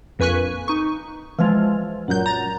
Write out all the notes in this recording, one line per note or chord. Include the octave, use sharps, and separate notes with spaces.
A#1 F2 B4 G#5 C#6 F#6
D#4 C#6
E3 F3 G#3 F4
F#2 A#2 F#3 G6
A#5 A6